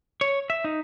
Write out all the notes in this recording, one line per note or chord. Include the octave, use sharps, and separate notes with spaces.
C#5
E5
D#4